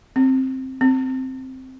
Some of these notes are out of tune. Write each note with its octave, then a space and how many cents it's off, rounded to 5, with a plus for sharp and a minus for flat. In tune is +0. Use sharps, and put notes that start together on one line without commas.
C4 +10
C4 +0